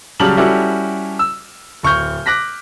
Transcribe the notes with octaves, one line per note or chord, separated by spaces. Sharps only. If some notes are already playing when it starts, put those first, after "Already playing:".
C#3 F#3 G3 A5 F6 F#7
G3 C#4 E4 F#4 A4
E6
D1 C#6 F6 G6
D6 F#6 A#6 B6